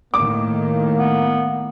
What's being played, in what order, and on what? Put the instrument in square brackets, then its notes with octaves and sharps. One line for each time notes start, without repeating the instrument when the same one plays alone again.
[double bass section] A2 D#3 [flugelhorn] A#3 [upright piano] D6
[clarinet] B3